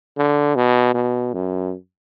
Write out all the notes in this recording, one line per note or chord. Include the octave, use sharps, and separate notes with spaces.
D3
B2
B2
F#2